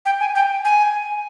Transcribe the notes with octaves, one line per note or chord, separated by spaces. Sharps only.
G5
G#5
G5
G#5